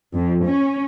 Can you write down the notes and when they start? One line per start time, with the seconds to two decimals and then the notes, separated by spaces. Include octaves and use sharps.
0.14 F2
0.46 C#4